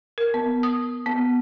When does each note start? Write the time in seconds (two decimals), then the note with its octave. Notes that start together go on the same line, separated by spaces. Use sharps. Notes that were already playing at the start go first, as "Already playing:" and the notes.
0.18 A#4
0.34 B3
0.63 D#6
1.06 B3